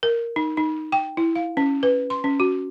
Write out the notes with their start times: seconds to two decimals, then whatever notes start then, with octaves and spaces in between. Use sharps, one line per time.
0.03 A#4
0.36 D#4
0.57 D#4
0.92 G5
1.17 E4
1.36 F5
1.57 C#4
1.83 B4
2.10 C6
2.24 C#4
2.40 F#4